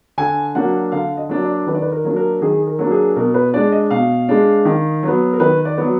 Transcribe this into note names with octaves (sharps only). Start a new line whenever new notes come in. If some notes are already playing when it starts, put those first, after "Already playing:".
D3 G#5
F#3 A#3 D4 F#5
D3 F5
D#5
F#3 A#3 D4
D5
D#3 B4
D5
B4
A#4
F#3 A#3 D4
A#4
D#3 G#4
A#4
F#3 A#3 D4
G#4
B2 A#4
B4
G#3 D4 D5
D#5
B2 F5
G#3 D4
D#3
F#3 B3
A#4
D#3 B4
D5
F#3 B3